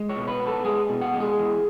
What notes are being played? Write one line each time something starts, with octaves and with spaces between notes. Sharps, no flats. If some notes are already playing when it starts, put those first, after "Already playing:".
Already playing: G#3
C#5
B2
B4
B3
A4
G#3 G#4
B2
F#5
G#3
G#4
E2